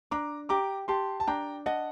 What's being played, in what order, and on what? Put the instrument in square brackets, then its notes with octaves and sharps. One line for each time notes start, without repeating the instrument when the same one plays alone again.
[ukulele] D4 [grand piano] A#5 D6
[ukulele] G4 [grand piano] A#5 D6
[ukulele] G4 [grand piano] A5 C6
[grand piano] A5
[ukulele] D4 [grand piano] G5 A#5
[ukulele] D#5 [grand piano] F#5 A5